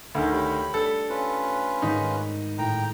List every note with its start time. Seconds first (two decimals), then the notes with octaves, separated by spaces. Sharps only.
0.15 D2 D#3
0.33 G4 C#5 G5 B5
0.74 A3 D4 A4
1.10 C#4 F4 B4
1.82 G#2 D#3 D#4 B5
2.58 A2 G5 A#5